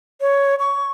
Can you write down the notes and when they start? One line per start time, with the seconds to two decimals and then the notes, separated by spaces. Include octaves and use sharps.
0.21 C#5
0.59 C#6